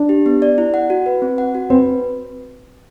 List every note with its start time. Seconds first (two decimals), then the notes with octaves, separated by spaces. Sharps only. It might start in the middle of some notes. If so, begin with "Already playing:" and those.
Already playing: D4
0.09 G4
0.26 B3
0.42 D5
0.58 E4
0.74 F#5
0.90 F#4
1.06 B4
1.22 C4
1.38 F#5
1.55 F#4
1.70 C4 B4